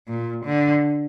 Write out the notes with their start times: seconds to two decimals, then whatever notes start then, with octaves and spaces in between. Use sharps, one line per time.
0.08 A#2
0.45 D3